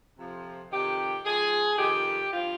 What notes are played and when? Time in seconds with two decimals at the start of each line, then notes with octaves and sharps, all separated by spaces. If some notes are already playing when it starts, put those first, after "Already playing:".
0.18 F2 C3 F3
0.71 F2 C3 D#3 G4
1.25 G#2 F3 G#4
1.79 F2 C3 D#3 G4
2.32 G2 F3 F4